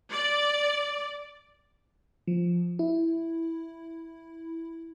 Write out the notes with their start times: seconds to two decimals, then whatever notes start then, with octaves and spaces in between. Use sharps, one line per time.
0.11 D5
2.28 F3
2.79 E4